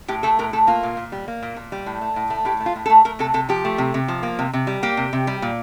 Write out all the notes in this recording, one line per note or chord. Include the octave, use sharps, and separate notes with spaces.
A2 G4
A3 A4
A2 A#4
A3 A4
A#3 F4
A#2
A#2
G3
A#3
A#2
A#2
G3
A2
A3
A2
A3
A2 G4
A3
F4
A2
A4
A3
A3 A#4
C3 A4
C3 A4
F3 G4
A3
C3
C3
F3
A#3
C3
C3
G3
A#3 G4
C3
C3
G3
A#2